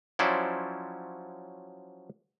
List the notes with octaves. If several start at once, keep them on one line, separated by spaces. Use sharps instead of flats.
F3 F#3 C#4 E4 C5 D5